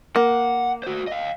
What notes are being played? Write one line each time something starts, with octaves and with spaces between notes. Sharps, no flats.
A#3 F#5
F#4 C5
D#5 F5